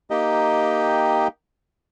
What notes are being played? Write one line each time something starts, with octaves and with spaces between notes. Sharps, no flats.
A#3 D#4 G4 D#5 G5